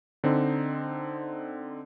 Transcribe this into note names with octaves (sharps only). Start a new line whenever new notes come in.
D3 C4 D#4